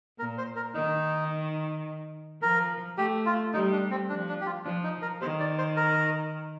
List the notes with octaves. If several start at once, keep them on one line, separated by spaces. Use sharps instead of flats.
A#2 A#4
C5
A#4
D#3 D#4
F3 A#4
A3 G4
F4
G3 D#4
D4
C4
F3 D4
D4
G4
F4
F3 D4
D#4
A#4
D#3 C5
D5
C5
A#4